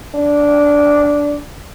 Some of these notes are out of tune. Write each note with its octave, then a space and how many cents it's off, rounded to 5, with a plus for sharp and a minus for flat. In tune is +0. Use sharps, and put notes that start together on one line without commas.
D4 -10